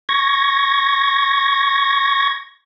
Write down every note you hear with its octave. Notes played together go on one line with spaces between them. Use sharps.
C#6 G#6 A#6